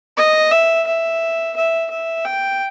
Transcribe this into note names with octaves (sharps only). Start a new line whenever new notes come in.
D#5
E5
E5
E5
E5
G5